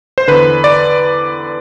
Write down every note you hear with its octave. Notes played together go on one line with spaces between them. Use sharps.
C5
E2 D3 B4
D5